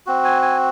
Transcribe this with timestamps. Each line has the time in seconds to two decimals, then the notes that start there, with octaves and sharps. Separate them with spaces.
0.06 C4 F#4
0.25 G#5
0.42 G#5